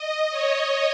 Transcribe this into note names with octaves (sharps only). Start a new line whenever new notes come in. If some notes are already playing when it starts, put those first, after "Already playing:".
Already playing: D#5
C#5